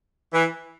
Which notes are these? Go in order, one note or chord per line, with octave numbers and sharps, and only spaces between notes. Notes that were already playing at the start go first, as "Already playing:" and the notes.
E3